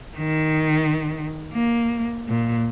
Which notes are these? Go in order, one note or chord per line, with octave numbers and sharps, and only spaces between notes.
D#3
A#3
A#2